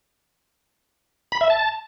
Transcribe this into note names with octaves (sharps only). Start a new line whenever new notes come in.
B5
E5
A5